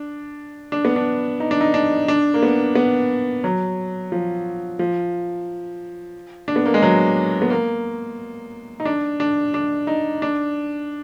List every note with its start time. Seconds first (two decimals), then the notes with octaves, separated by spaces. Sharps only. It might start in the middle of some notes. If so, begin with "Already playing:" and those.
Already playing: D4
0.72 D4
0.85 B3
0.96 D4
1.40 D#4
1.51 D4
1.61 D#4
1.74 D4
2.08 D4
2.34 A#3
2.43 B3
2.75 B3
3.44 F#3
4.12 F3
4.79 F3
6.48 D4
6.56 B3
6.66 A#3
6.74 G#3
6.83 F#3
7.42 B3
7.50 A#3
8.80 D#4
8.85 D4
9.20 D4
9.54 D4
9.87 D#4
10.22 D4